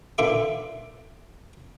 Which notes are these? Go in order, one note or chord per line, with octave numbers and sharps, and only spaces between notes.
A#2 D3 F4 B4 E5 D6